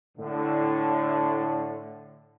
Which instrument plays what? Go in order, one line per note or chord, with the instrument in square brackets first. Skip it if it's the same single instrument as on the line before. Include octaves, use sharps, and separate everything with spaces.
[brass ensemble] A2 D3